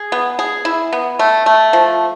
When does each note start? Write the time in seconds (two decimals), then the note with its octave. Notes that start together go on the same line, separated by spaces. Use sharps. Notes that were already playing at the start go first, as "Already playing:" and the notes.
Already playing: G#4
0.12 B3
0.39 G#4
0.65 E4
0.93 B3
1.19 A3
1.46 A3
1.73 F3